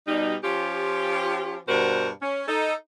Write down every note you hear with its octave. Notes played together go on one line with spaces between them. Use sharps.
B2 G3 D#4
F3 C#4 F4 G4
G2 B2 G3 F#4 A#4 C5
C#4
D#4 A4